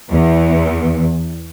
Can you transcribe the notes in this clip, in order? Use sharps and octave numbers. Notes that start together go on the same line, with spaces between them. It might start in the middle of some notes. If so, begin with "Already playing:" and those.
E2